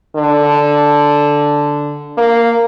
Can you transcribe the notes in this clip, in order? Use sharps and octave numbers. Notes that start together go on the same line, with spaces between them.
D3
A#3